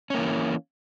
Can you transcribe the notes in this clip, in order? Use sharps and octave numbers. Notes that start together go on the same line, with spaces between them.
E3 A#3 C#4